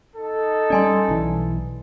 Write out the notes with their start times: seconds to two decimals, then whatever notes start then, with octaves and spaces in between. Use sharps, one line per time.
0.15 D#4 A4
0.70 G3 C#4 D5 G#5 C6
1.09 B1 E3